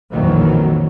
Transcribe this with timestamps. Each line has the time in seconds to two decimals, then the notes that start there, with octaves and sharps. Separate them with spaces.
0.12 B1 F2 A#2 D#3 E3 F#3